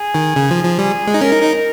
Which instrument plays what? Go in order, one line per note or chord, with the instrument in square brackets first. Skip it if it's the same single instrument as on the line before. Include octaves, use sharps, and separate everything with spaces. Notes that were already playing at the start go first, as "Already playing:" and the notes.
Already playing: [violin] G#4
[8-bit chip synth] D#3
C#3
F3
F3
[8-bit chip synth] G3 [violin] G#4
[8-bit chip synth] G#3
D#4
[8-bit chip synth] C#4 [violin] A#4
[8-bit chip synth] D#4
D#4